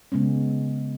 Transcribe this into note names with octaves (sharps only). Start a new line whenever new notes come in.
C#3 G#3 B3 C#4